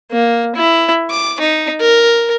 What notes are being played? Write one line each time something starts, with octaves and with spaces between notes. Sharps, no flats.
A#3
E4
D6
D#4
A#4